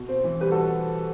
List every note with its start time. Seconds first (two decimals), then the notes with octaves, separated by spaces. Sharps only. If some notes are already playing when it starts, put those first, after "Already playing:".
Already playing: B2
0.09 C4
0.24 E3
0.40 G3 G4 B4
0.51 F#4 A4